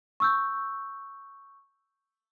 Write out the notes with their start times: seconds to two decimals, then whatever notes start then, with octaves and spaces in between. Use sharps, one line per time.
0.20 C#6 E6 G6